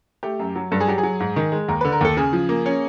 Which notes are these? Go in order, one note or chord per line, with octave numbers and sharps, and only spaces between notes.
A3 G4
F#2
F#3
G2 A4
G#4
F#3 G4
G#4
F#3
G#2
D#3
G#3
D#2 A#4
B4
D3
A#4
D#2 A4
C#3 G#4
F3
A#3
C#4